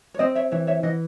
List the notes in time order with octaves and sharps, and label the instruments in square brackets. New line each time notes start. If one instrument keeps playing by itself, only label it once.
[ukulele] C#5
[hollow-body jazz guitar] C4 [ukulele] C5 D#5
[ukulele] C#5 E5
[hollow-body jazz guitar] E3 [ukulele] C#5 E5
[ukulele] C#5 E5
[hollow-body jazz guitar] E3 [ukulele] D#5 F#5